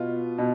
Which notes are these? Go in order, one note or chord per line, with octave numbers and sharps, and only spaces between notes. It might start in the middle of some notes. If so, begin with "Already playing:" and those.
Already playing: B2 B3 F4
B2